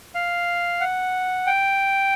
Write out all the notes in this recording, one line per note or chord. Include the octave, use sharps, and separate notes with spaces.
F5
F#5
G5